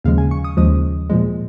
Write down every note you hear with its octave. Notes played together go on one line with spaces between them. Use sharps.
D#2 C#3 F3 G#3 F5
G#5
C#6
D#6
D#2 C#3 F3 G#3 D#6
A#2 F3 G#3